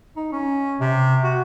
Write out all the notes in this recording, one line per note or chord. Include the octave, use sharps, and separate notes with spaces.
D#4
C#4
C3
F#4